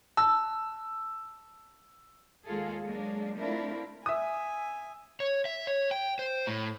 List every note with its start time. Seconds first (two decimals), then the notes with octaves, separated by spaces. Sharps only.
0.17 A5 E6
2.46 D#2 G#3 A#3 F4 G#4 A4
2.84 F#3 G#3 A#3 D4
3.36 A3 C4 D4 E4 F4 A#4
4.06 E5 G#5 D#6
5.20 C#5
5.45 E5
5.67 C#5
5.91 G5
6.19 C5
6.47 A2